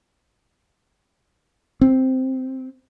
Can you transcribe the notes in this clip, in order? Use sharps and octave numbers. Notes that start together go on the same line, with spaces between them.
C4